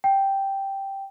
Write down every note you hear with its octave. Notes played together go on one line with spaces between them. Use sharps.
G5